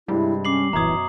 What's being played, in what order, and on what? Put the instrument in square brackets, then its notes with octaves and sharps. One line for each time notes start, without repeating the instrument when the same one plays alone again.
[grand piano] G2 C3 G#3 [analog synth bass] G3 [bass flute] E4
[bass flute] C#4 [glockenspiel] D6 C7 F#7
[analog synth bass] D#1 [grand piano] F#2 B2 G#6 [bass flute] E3 [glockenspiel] A#5 D#6